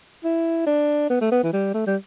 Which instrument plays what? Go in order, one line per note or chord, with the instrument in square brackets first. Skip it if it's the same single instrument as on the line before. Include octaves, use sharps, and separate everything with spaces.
[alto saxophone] E4
D4
B3
A3
B3
E3
G3
A3
G3